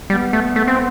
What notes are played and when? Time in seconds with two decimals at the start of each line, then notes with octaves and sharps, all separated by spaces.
0.09 G3 B3
0.33 A3
0.56 A3
0.68 C4